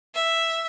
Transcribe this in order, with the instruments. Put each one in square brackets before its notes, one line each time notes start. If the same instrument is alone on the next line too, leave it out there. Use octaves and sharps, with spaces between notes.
[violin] E5